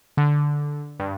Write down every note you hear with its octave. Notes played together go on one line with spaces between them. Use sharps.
D3
G2